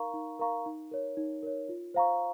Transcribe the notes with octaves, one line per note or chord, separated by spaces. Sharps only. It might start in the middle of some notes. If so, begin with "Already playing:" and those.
Already playing: D#4 A#4 F5 A#5 C#6
D#4
A#4 F5 A#5 C#6
D#4
A#4 C#5
D#4
A#4 C#5
F4
C5 F5 A#5 C#6